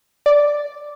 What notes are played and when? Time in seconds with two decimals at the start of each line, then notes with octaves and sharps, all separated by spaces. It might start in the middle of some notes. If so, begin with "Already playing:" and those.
0.26 D5